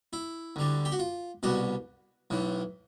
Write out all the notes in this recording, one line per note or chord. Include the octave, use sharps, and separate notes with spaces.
E4
D2 D3 G3
G4
F#4
F4
C2 B2 G3 F#4
B1 A2 E3